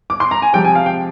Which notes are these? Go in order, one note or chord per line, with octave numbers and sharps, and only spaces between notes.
D6
C6
A#5
G#5
C3 F3 G#3 G5
G#5
F5
G5